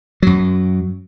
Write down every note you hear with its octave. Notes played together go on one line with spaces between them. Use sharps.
F#2 F#3